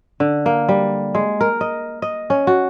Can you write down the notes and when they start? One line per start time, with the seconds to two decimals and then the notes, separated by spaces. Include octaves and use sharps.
0.20 D3
0.46 A#3
0.69 G3
1.15 G#3
1.41 A#4
1.61 D#5
2.02 D#5
2.30 C#4
2.47 F#4